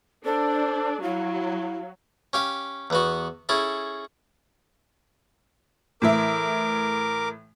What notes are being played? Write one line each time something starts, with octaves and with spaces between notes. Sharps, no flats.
D4 A4 C5
F#3 E4 F5
C#4 G4 F5
E2 B3 F#4
C#4 E4 G#4 A4
A2 E3 A#4 E5 D6